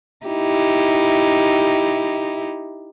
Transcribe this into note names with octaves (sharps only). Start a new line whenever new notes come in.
D#4 E4 G4